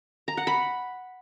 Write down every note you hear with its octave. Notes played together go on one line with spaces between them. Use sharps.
A#5
F#5
B5